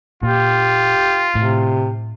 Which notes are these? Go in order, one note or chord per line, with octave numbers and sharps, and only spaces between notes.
A#2 F4 G4
A2 C3